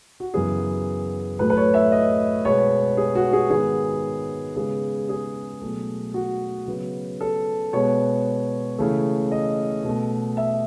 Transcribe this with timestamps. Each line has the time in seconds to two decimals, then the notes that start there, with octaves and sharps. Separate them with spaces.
0.20 F#4
0.34 F#2 C#3 E3 B3 G#4
1.39 A2 F#3 A3 B4
1.50 B4
1.57 C#5
1.74 E5
1.92 D#5
2.45 B2 G#3 B3 C#5
2.97 G#4
3.15 F#4
3.33 G#4
3.50 G#2 D#3 G#3 B3 G#4
4.56 C#3 G#3 B3 G#4
5.09 G#4
5.61 B2 F#3 A3
6.14 F#4
6.67 C#3 F#3 B3
7.20 A4
7.73 B2 G#3 B3 C#5
8.78 C#3 E3 A3
9.32 D#5
9.84 B2 A3
10.37 E5